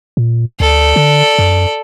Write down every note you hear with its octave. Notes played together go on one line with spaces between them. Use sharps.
A#2
D2 A4 D5
D3
F#2